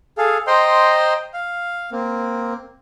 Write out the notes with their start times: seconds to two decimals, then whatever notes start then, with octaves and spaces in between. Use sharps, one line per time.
0.18 G#4 A4 F5
0.47 C5 D#5 G5 A#5 C6
1.34 F5
1.92 A#3 C4